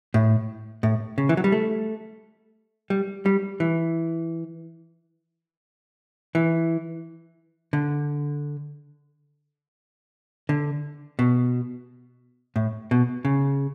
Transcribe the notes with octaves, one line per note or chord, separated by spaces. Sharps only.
A2
A2
C#3
E3
F#3
G3
A3
G3
G3
E3
E3
D3
D3
B2
A2
B2
C#3